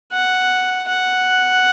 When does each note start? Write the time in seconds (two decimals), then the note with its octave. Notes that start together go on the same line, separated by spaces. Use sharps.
0.13 F#5
0.88 F#5